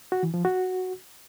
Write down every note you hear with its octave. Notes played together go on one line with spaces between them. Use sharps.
F#4
E3
F3
F#4